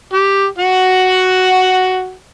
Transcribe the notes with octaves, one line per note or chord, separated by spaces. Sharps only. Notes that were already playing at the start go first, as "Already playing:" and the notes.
G4
F#4 F#5